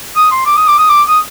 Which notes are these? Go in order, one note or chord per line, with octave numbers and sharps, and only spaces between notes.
D#6
C6
D6
D#6
D6
D#6
D6
D#6